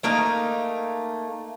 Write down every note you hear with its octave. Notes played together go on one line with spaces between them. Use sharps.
A3 A#3 D#4 F5